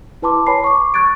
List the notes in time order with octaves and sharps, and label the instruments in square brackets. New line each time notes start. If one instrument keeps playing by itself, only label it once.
[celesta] E4 B4 A5 C6 D6
B4 C#5 G#5 A5 B5 C7
C#6 D6
C#6 F#6 G#6 A6 D7